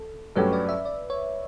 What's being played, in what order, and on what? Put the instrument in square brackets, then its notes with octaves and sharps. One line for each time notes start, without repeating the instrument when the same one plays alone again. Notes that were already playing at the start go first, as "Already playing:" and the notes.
Already playing: [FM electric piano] A4
[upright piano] G2 F#3 A3 C#4 G4 [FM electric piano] B4
[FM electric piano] D5
E5
D5
C#5